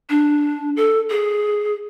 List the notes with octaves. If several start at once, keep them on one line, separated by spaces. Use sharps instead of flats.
D4
A4
G#4